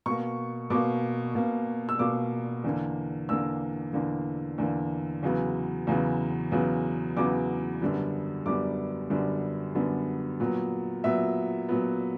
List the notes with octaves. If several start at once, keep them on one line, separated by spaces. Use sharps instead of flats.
B2 A#3 C#6
B2 A#3 D6
B2 A#3
E6
B2 A#3 D6
E2 D3 A#3
E2 D3 A#3 E6
E2 D3 A#3
E2 D3 A#3
E2 C#3 F#3 B3
E2 C#3 F#3 B3
E2 C#3 F#3 B3
E2 C#3 F#3 B3 D6
F#2 D3 G3 B3
F#2 D3 G3 B3 D6
F#2 D3 G3 B3
F#2 D3 G3 B3
A#2 F#3 B3
A#2 F#3 B3 E5
A#2 F#3 B3